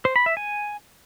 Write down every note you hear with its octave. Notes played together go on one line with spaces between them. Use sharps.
C5
B5
E5
G#5